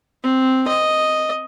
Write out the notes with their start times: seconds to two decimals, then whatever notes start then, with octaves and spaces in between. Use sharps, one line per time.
0.23 C4
0.68 D#5